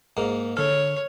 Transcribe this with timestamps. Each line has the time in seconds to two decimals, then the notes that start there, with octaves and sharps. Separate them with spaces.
0.17 G#2 A#3
0.57 D3 A4 C#5 F6